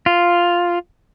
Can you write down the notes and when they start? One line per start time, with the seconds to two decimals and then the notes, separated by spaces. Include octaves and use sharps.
0.06 F4